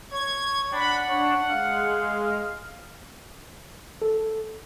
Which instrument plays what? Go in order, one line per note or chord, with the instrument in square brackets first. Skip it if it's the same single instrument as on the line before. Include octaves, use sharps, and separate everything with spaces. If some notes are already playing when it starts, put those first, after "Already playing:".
[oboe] C#5 [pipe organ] G#6
[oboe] D4 [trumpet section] F#5 [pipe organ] B5
[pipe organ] D4 [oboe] C#5
[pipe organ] G#3 [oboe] F5
[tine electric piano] A4